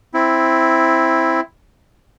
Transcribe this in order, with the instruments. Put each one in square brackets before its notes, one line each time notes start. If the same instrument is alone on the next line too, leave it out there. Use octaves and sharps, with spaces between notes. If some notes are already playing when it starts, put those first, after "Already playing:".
[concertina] C4 E4